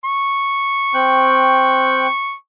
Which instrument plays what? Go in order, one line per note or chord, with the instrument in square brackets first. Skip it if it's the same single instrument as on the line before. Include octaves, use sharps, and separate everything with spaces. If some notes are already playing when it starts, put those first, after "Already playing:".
[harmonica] C#6
[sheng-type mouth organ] C4 G5 F#6